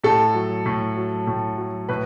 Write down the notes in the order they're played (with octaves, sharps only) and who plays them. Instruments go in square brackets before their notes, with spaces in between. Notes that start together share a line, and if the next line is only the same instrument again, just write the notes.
[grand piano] A2 A4
F#3
A2
F#3
A2
F#3
A2 B4